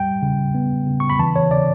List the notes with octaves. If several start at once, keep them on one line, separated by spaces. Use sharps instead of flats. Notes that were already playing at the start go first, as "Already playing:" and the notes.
Already playing: G3 G5
C#3
B3
C#3
C#6
B5
E3 A5
C#5
C#3 D5